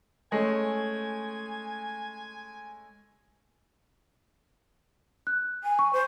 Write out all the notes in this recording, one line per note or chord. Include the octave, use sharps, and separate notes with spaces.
G#3 A3 C#4 G#5
F#6
G#5
C#6
C5